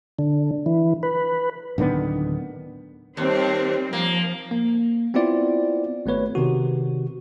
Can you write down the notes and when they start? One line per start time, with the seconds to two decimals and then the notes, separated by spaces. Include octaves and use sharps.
0.19 D3
0.66 E3
1.03 B4
1.78 D1 D3 D#3 B3
3.17 D#2 G3 C4
3.93 F3 A#3
4.51 A#3
5.14 B3 C4 E4 F4 D5
6.06 G#1 A3 B3 B4 C#5
6.35 C3 D#3 F#4